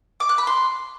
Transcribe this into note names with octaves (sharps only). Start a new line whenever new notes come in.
D6
F#6
B5
C6